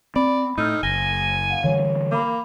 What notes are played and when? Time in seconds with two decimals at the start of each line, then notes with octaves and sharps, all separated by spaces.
0.16 C4 D5 B5
0.58 A2 D#4 E6 F6 G6
0.83 F#1 G#5 A#6 D#7 G7
1.50 F5 F#5
1.64 D3 E3 G3 C#5
2.12 A#3 B5 D6